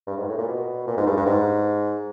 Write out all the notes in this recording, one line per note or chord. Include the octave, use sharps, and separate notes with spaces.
G2
G#2
A2
A#2
B2
A#2
G#2
G2
G2
G#2